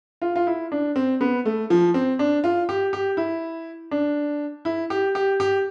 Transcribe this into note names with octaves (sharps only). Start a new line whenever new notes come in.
F4
F4
E4
D4
C4
B3
A3
F3
C4
D4
F4
G4
G4
E4
D4
E4
G4
G4
G4